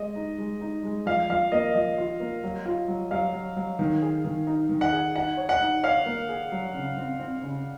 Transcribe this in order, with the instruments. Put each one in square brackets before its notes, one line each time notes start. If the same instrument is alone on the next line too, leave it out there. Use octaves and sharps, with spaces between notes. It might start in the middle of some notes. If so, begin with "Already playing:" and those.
Already playing: [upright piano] G#3 [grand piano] D#5
[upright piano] D#4
G#3
D#4
G#3
[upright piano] F3 [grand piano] F5
[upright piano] F3 [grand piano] F5
[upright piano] A#3 [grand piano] D#5
[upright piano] F3 [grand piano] D#5
[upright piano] F4
A#3
F#3
F4
F#3
[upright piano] F#3 [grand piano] F5
[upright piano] F#3
F#3
D#3
G#4
D#3
D#4
D#3
[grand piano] F#5
[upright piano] G#4
[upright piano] D#4 [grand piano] F#5
[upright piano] C#5
[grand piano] F#5
[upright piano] D#4
[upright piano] C#5 [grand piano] F5
[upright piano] A#3
G#4
F#3
C#3
C4
C4
C#3